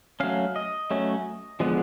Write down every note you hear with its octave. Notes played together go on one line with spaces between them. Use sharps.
F#3 A3 C#4 F5
D#5
F#3 A3 C#4
D3 F3 G#3 B3